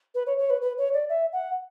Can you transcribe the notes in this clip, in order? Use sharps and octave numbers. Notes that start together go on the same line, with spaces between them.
B4
C#5
C#5
B4
B4
C#5
D5
E5
F#5